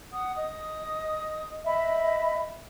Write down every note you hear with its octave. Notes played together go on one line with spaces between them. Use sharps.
F#5 D#6
D#5 D#6
D#5 E5 B5